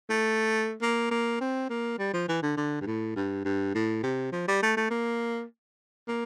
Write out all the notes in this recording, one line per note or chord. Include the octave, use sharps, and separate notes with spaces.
A3
A#3
A#3
C4
A#3
G3
F3
E3
D3
D3
G2
A2
G2
G2
A2
C3
F3
G3
A3
A3
A#3
A#3